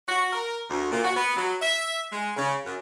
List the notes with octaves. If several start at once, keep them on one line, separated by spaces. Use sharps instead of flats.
F#4
A#4
D2
A#2
F#4
B3
F#3
E5
G#3
C#3
F#2